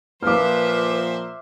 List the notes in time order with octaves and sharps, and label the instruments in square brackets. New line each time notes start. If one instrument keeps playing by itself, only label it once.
[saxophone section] A#2 F3 [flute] B4 [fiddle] C5 E5 [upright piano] D6 F6